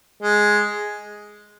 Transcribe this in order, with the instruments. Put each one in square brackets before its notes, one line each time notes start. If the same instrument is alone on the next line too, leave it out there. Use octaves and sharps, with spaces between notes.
[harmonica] G#3